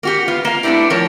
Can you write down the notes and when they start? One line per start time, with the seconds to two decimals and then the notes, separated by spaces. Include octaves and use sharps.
0.03 A#3 F#4 G4
0.28 B3 F4 F5
0.45 A#3 F5
0.63 A3 B3 C4 D4 E4 G4
0.90 A2 F3 A#4 C#5